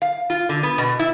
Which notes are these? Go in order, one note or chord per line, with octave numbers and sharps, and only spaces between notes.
F5
F4
D3
B3
B2
E4